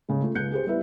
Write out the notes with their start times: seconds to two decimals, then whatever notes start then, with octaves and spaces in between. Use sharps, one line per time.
0.09 C#3 G#3
0.21 A3 F4
0.35 C#2 F#6 G6 C#7
0.51 G4 G#4 C5
0.67 G3 B3 E4 B4 E5